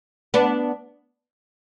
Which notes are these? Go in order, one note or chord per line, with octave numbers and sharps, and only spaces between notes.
B3 D4